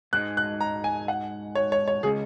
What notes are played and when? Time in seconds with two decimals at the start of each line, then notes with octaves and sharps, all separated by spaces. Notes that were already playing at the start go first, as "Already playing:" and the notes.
0.13 G#2 G#3 D#4 F#6
0.37 F#6
0.61 A#5
0.84 G#5
1.08 F#5
1.55 C#5
1.72 C#5
1.88 C#5
2.03 C#3 G#3 C#4 G#4